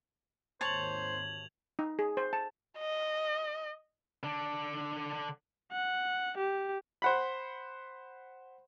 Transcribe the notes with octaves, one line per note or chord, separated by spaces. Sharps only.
G#1 D#2 C5 C#5 A5 G#6 F7 F#7
D#4
G#4
C5
A5
D#5
D3 D4
F#5
G4
C5 F#5 B5